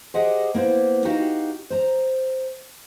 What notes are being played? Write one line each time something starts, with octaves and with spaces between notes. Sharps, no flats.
G4 G#4 C5 D#5 F#5
A#3 B3 E4 C5
D#4 F#4 G4 F5
C5 A#5